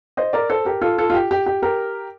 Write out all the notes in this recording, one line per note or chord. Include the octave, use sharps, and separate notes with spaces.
C5 D#5
A#4 D5
A4 C5
G4 A#4
F4 A4
F4 A4
F4
G4
G4
G4
G4 A#4